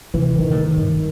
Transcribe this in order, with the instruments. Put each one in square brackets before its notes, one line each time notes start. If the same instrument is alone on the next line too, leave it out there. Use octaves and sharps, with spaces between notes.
[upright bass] C3 [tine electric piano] E3
[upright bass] A#2 [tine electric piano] D#3
[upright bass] A2
G2